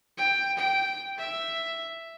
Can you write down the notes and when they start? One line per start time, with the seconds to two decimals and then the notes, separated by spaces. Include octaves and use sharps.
0.18 G5
0.57 G5
1.18 E5